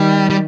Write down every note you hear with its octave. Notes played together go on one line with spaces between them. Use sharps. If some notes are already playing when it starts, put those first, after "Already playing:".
Already playing: D#3 G3
G3